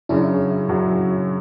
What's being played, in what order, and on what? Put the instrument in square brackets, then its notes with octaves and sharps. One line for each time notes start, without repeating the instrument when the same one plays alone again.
[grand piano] F#2 C#3 F#3 [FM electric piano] D4 E4
[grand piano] F#2 C#3 F#3